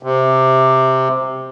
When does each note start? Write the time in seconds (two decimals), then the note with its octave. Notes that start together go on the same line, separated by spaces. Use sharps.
0.03 C3